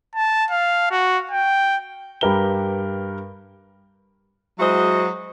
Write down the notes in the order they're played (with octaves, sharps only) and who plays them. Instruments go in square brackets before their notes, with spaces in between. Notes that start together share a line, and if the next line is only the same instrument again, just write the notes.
[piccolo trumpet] A5
F5
F#4
G5
[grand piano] G2 G4 A#4 B4 G7
[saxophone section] F#3 G#3 E4 F#4 C5 D#5